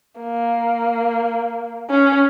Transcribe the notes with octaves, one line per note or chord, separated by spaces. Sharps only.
A#3
C#4